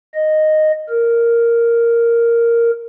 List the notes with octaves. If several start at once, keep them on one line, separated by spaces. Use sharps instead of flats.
D#5
A#4